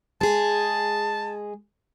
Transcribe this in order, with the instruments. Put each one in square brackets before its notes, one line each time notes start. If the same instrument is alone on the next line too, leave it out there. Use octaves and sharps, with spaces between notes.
[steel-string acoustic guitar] G#3 G#4 [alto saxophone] A5